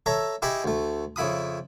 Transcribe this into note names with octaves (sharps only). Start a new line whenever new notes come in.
A4 C#5 E5 A#5
E4 G4 G#4 D#5 B5 C#6
D2 A3
F2 C#3 E4 B5 D#6